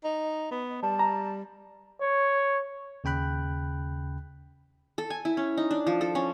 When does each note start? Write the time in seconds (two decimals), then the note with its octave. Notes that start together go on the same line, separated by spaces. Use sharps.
0.04 D#4
0.51 B3
0.83 G3 A5
0.99 A#5
2.02 C#5
3.04 D#2 C#3 G5 B5 F#6
4.98 A4
5.10 G#5
5.25 E4
5.37 C#4
5.57 D#4
5.71 D4
5.87 F3
6.01 A4
6.15 C#4